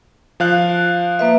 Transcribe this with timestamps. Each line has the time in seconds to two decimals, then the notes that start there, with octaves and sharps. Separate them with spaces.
0.40 F3 F5 F#6
1.19 A#3 B4 E5